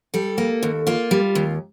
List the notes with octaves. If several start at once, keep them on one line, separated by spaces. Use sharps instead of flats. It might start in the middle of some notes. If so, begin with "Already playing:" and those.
G3 A4
A#3
D#2
A#3 F4
G3
D#2